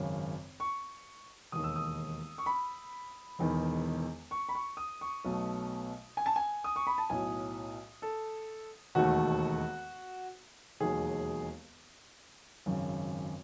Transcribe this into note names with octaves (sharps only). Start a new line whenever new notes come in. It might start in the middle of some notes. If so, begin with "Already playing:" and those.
Already playing: G#1 F#2 C#3
C#6
E1 D#2 D#3 D#6
E6
D#6
C#6
B5
E1 E2 D#3
C#6
B5
C#6
D#6
C#6
B1 B2 F#3 A3
G#5
A5
G#5
D#6
C#6
B5
A5
B1 A2 F#3 G#5
A4
E1 D#2 D#3 A3 F#4
E1 D#2 D#3 F#3 G#4
G#1 F#2 C#3